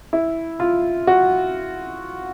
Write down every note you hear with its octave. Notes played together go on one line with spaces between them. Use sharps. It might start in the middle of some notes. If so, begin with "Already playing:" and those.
E4
F4
F#4